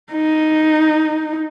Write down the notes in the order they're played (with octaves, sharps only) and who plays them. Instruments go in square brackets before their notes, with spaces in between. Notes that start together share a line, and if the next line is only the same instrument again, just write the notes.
[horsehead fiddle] D#4